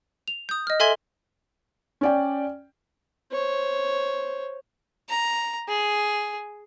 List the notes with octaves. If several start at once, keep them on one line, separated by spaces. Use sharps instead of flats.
F7
D#6 G6
D#5 F6
A4 E5 G#5 C6 G#6 G7
C#4 D5 G5
C5 C#5
A#5
G#4